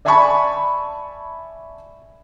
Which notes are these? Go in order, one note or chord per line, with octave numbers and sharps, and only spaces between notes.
D5 E5 G#5 A5 B5 C#6